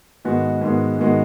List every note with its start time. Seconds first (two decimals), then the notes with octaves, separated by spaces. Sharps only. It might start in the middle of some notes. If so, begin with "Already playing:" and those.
0.24 G#2 D#3 G#3 B3 F#4
0.62 G#2 D#3 G#3 B3 F#4
0.99 G#2 D#3 G#3 B3 F#4